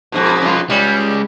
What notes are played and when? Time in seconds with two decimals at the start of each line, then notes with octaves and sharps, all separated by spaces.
0.12 F2 G#2 B2
0.42 C#4 F4
0.70 G3 G#3 C#4